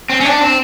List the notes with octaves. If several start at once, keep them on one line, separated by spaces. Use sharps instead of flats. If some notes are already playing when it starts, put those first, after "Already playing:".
C4
C#4
D4
C4